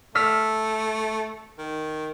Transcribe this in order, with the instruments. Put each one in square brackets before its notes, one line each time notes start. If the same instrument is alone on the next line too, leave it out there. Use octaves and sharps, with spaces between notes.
[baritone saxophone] A3 [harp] E6 F6 B6
[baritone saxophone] D#3